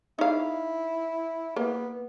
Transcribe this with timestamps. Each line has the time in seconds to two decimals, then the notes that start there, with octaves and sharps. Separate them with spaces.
0.19 D#4 E4 F5
1.56 A#3 B3